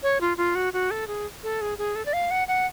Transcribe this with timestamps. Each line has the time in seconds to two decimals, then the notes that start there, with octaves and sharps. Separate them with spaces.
0.03 C#5
0.21 F4
0.37 F4
0.55 F#4
0.73 F#4
0.91 A4
1.07 G#4
1.43 A4
1.61 G#4
1.78 G#4
1.95 A4
2.06 D5
2.13 F5
2.31 F#5
2.48 F#5